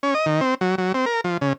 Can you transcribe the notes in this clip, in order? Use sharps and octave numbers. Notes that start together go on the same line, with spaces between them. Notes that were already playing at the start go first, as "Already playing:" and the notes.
C#4
D#5
D#3
C4
F#3
F#3
C4
A#4
F3
C#3